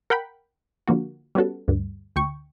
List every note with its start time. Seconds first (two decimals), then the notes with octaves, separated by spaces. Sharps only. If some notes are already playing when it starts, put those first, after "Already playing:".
0.10 A#4 F#5 G5 B5
0.88 D3 F3 A#3 F#4
1.35 G3 B3 C#4 F#4 A4
1.68 D2 G2
2.16 D2 G5 C#6